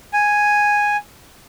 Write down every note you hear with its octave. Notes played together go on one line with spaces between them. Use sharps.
G#5